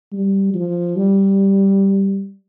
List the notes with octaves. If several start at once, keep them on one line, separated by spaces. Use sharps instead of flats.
G3
F3
G3